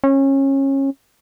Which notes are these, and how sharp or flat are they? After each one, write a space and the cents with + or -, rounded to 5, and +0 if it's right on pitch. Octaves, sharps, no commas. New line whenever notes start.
C#4 -25